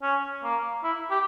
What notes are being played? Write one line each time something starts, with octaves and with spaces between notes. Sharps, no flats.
C#4
A#3
E4
G4